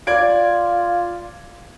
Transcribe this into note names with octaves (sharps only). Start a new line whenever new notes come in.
F4 D5 G#6 D7